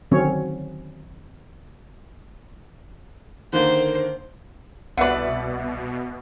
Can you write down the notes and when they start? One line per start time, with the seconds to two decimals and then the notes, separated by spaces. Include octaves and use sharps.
0.11 D3 D#3 F#3 C4 C#4 C#5
3.53 D3 D#3 A#3 C5
4.97 C2 B2 D3 B4 D5 E5 F#5